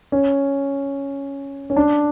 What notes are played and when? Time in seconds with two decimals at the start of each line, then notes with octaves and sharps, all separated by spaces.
0.12 C#4
1.70 C#4
1.76 D4